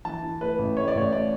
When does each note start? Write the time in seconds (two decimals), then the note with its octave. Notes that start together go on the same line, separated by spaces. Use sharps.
0.05 E3 A5
0.23 E3
0.41 A2 B4
0.58 A1
0.77 A2 C#5
0.88 D5
0.95 A1 C#5
1.12 A2 D5